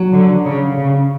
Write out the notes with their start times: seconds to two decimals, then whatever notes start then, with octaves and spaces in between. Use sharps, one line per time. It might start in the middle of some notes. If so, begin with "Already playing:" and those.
Already playing: F#3
0.12 D3
0.45 C#3
0.77 C#3